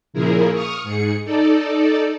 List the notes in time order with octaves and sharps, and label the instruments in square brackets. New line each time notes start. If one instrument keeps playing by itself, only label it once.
[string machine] A#2 C#3 F3 E4 G#4 A#4
C#6 D#6 F6
G#2 G#4 C#7
D#4 A4 D5